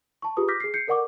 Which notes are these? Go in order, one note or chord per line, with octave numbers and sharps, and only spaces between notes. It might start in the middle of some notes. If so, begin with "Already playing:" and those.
A5 C#6
F4 G4 G#4 B4 D#6
D6 F6 G6 A#6 B6
G#4 C7
G6 C7 C#7
A4 A#4 D5 F#5 C#6 D6